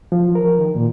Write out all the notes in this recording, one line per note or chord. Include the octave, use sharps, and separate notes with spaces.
F3
A#4
D#3
A#2